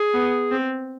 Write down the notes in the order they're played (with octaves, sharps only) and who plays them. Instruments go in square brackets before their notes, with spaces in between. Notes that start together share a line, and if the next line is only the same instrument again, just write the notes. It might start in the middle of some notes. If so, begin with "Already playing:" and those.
Already playing: [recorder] G#4
[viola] B3
C4